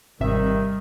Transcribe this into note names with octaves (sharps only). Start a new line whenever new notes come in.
G#1 C3 D#3 G3 E5